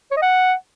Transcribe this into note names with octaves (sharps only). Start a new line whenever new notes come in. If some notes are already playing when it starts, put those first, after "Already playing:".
C#5
D#5
F#5